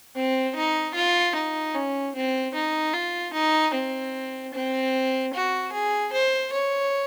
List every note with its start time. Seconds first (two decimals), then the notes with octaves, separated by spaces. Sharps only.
0.15 C4
0.55 D#4
0.95 F4
1.35 D#4
1.74 C#4
2.15 C4
2.55 D#4
2.93 F4
3.33 D#4
3.74 C4
4.54 C4
5.34 F#4
5.72 G#4
6.13 C5
6.52 C#5